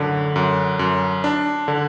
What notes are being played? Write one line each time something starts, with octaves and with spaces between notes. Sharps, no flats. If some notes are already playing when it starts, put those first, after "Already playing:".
Already playing: F#2 A2 D3
F#2
F#2
D4
D3